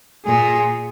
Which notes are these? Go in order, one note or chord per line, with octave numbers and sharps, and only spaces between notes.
A#2 G#4